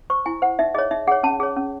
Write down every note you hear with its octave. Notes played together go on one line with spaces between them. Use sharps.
C5 C#6
E4 G#5
C5 F#5
D#4 E5
G#4 C#5 D#5
D#4 E5
G#4 C#5 F#5
C#4 A5
G#4 C#5
C#4